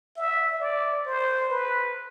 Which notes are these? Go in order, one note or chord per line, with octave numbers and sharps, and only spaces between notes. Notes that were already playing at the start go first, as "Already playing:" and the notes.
E5
D5
C5
B4